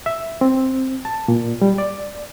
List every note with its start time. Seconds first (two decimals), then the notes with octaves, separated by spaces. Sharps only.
0.06 E5
0.41 C4
1.05 A5
1.28 A#2
1.62 G3
1.78 D5